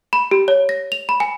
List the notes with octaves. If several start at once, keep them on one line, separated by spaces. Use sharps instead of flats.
B5
G4
C#5
A#6
F7
B5
G#5